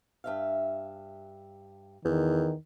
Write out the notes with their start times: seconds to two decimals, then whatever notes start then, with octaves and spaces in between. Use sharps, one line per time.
0.24 G2 E5 F5
2.05 E2 D#3